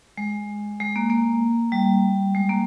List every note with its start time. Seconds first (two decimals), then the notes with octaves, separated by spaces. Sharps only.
0.18 G#3
0.80 G#3
0.96 A#3
1.10 A#3
1.72 G3
2.35 G#3
2.49 A#3